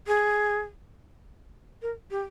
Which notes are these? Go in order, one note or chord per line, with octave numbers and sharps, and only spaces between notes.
G#4
A#4
G4